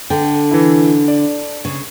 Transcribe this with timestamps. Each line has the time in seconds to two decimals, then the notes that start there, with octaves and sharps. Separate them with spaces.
0.10 D3 G5
0.51 E3 E4
1.08 D5
1.65 C#3